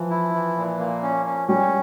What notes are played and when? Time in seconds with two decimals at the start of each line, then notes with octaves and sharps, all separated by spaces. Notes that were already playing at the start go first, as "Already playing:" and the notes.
Already playing: E3 F3
0.10 E4
0.34 E3
0.56 A#2
0.80 A#3
1.03 C#4
1.26 C#4
1.48 G3 C#4